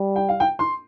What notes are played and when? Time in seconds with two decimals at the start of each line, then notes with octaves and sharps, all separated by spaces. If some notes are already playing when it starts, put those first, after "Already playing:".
Already playing: G3
0.16 G5
0.29 F5
0.40 G5
0.59 C6